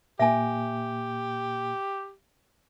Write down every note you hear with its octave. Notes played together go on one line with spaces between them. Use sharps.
A#2 A#3 G4 E5 G#5